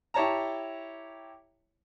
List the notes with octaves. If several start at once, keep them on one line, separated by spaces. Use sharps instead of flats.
E4 G4 C#5 A5 A#5